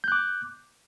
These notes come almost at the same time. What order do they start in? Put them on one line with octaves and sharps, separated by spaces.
G6 F#6 D6